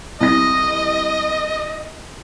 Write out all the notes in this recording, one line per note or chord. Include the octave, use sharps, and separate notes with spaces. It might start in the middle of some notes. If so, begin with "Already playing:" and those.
C2 D#5 A#6